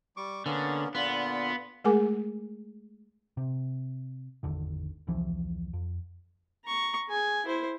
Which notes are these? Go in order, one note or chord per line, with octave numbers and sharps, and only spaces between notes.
G3 C#6 D6
D3 A#3 B3 C#4
A#2 D3 B3 F4
G#3 A3 G#4 A#4 G#5 D6
C3
G#1 E2 D3 D#3
E1 C2 E3 F3
F2
A#5 C#6
G#4 G#5
E4 C5